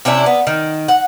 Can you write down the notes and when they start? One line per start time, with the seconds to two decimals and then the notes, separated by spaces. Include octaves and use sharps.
0.05 C3 C#4 D4 E4
0.26 B3
0.47 D#3
0.88 F#5